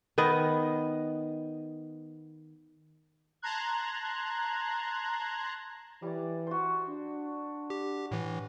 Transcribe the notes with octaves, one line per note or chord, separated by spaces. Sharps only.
D#3 B3 D#5
A5 A#5 C6 F#6 G#6
E3 G3 D5
F#4 C5
D4
G4
A2 E3